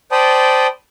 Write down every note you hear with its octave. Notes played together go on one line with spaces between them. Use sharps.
C5 D5 G5 A5 B5 D#6